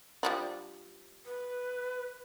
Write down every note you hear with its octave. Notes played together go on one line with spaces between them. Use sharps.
F3 G3 D4
B4